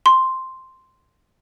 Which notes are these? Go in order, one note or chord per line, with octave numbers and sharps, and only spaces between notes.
C6